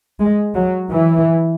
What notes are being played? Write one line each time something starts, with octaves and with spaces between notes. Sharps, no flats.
G#3
F#3
E3